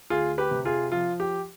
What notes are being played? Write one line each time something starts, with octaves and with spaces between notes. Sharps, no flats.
D2 F4 G#4
G4 B4
C3
F4 G#4
F3 F4
G4